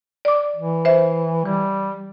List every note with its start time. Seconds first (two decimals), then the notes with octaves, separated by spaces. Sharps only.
0.25 D5 D6
0.57 E3
0.85 C5 E5
1.45 E3 G3